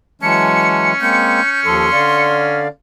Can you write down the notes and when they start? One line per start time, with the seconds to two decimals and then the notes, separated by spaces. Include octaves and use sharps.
0.22 E3 F#3 G#3 C#4 A5 C#7
1.01 G#3 A#3 C4 G6
1.65 D#2 F3 A4 C6
1.93 D3 D5 F5